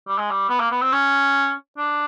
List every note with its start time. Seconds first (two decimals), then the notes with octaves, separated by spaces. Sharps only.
0.07 G3
0.19 G#3
0.31 G3
0.49 B3
0.60 A#3
0.71 B3
0.82 C4
0.92 C#4
1.78 D4